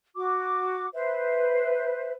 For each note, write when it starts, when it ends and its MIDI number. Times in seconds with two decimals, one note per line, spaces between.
0.15 0.86 66
0.15 0.86 86
0.93 2.11 71
0.93 2.11 72
0.93 2.11 76